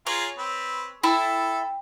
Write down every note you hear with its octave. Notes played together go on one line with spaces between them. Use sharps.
F4 G#4 C#5 A#5
C4 B4
E4 A4 G5 A5